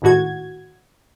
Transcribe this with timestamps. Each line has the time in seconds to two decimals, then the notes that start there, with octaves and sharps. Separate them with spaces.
0.02 G#1 D#2 A2 F#4 G#6